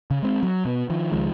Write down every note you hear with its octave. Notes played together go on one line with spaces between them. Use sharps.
C#3
G#3 C4
F#3
B2 B3
D#3 F3
C#2 D#3 F3 G#3